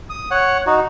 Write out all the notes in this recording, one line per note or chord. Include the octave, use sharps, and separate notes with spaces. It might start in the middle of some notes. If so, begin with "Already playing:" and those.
D#6
C#5 F#5
D#4 F#4